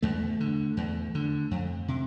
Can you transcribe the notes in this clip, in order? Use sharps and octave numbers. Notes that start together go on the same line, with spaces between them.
E2 A3
D3
E2
D3
F2
C3